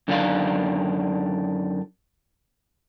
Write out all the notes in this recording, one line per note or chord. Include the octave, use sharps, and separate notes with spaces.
F#2 D3 D#3 D4 G4 F5